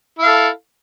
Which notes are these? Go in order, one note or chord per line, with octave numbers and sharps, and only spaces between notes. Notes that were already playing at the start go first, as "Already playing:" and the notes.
E4 A4 F5